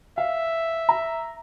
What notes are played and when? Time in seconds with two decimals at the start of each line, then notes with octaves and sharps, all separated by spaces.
0.18 E5 F5
0.89 A#5